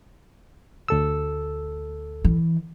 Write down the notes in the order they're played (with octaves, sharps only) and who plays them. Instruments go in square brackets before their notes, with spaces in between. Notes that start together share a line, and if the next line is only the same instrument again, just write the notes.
[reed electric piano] D2 A4 E6
[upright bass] E3